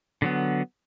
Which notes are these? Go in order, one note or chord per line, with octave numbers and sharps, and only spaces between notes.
D3 F#3 B3